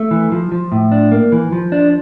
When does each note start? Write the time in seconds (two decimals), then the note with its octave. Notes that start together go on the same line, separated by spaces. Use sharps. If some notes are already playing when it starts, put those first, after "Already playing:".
Already playing: A3
0.11 E3
0.32 F3
0.52 F3
0.72 A2
0.92 D4
1.12 A#3
1.32 E3
1.52 F3
1.72 D4